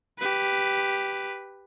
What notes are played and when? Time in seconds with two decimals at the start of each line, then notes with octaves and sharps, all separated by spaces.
0.19 G4 B4